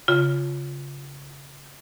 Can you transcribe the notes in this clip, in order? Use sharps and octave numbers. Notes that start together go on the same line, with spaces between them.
C#3 F4